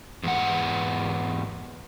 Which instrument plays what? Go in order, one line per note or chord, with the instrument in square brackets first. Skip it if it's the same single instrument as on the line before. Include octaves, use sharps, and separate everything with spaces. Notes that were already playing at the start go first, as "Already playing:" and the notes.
[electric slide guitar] E2 G#2 F#5